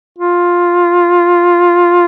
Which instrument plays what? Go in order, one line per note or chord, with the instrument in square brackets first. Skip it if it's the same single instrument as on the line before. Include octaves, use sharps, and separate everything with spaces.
[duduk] F4